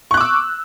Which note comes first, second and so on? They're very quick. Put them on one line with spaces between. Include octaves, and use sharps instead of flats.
C#6 F#6 D6 E6